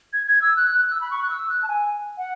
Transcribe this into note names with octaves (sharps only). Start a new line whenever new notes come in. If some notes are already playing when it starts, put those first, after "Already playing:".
G#6
G#6
E6
F#6
F#6
E6
B5
C#6
F#6
E6
F#6
A5
G#5
F#5